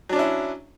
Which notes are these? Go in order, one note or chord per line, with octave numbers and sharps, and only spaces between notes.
F#3 C#4 D4 E4